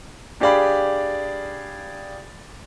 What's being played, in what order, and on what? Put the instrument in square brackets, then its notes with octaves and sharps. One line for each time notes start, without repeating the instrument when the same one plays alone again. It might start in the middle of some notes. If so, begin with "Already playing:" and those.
[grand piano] D4 G4 G#4 D5 F5 B5